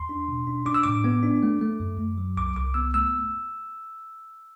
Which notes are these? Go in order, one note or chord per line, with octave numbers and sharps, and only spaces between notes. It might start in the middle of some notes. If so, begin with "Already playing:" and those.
Already playing: E2 C6
D4
B2
D4
D4 D6
E6
A2 D6
B3
D4
A3
A3
F#2
F#2
F#3
C2 D6
C2 D6
B3 E6
A3 E6